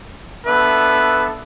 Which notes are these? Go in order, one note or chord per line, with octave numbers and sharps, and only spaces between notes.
B3 D4 A4 B4 E5